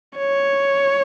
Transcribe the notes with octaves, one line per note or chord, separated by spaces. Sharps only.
C#5